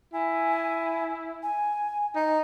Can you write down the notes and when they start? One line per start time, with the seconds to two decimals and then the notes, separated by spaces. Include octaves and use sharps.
0.13 E4 G#5
1.43 G#5
2.16 D#4